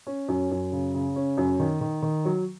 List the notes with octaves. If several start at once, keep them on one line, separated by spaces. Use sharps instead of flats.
C#4
F#2
F#2
C#3
C#3
C#4
F#2
D#3
D#3
D#3
F#3